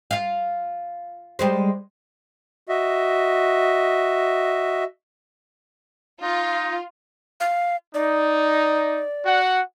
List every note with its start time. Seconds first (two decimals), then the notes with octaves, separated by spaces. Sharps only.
0.11 F4 F5
1.39 G3 G#3 C5
2.69 F#4 D#5 E5
6.22 D#4 F4
7.40 F5
7.94 D#4 D5
9.25 F#4 F#5